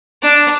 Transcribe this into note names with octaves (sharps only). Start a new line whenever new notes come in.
D4